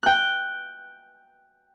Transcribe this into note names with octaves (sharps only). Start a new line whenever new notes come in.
G5 F#6